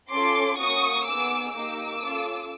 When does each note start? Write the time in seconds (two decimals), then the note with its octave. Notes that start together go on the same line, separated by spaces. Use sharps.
0.12 C#4 F4 A4 C6 D6
0.59 A#3 C#4 F#4 C#6 D#6
1.06 B3 D#4 G#4 D6 E6
1.53 A#3 D#4 G4 D6 E6
2.01 C#4 F4 A4